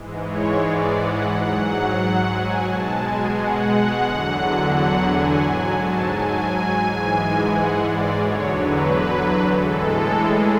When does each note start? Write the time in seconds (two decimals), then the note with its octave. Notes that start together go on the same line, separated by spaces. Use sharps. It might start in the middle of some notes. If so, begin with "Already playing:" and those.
Already playing: G#2 E3 G#3
0.24 C#5
0.60 D5
0.94 F#5
1.28 G#2 F#3 F#5
1.63 F#5
1.96 F#5
2.31 G#5
2.65 B2 G#3 A5
3.00 G#5
3.34 F#5
4.03 E2 D3 F#3
4.72 F#5
5.06 G#5
5.40 G#2 F#3 G#5
5.75 A5
6.09 G#5
6.77 G#2 E3 G#3
7.47 F#5
7.81 D5
8.15 E2 D3 F#3 C#5
8.50 B4
9.52 A2 E3 G#3 A4
10.21 G#4